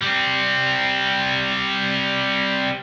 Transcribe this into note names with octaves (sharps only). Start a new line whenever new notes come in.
G3 C4